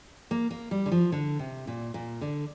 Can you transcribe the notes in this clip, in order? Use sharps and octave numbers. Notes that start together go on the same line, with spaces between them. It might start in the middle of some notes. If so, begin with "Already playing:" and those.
A#3
A#3
G3
D3
F3
D3
C3
A#2
A#2
D3